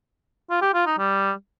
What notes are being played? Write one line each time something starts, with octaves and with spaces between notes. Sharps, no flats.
F4
G4
F4
D#4
G3